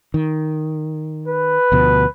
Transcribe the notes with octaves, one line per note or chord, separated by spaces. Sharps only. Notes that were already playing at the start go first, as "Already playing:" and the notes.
D#3
B4
D2 B2 F3